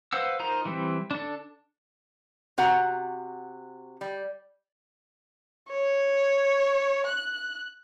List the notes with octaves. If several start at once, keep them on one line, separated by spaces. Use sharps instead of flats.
B4 C5 F5 F#5 E6
D#4 F4 A#4 C5 A#5
E3 G3 C4
D4 A4
C3 F#4 F#5 A#5
G3
C#5
F#6